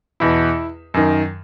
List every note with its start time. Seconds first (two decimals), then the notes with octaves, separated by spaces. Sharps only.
0.20 E2 B2 E4
0.94 F#2 D#3